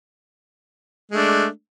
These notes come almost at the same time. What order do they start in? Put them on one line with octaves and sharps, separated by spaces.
G#3 A3 D4